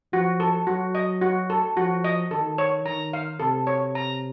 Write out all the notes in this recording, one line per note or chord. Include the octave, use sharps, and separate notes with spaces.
F3 F#4
A4
F#3 F#4
D#5
F#4
A4
F3 F#4
D#5
D#3 A4
C#5
D#3 A#5
F5
C3 A4
C#5
A#5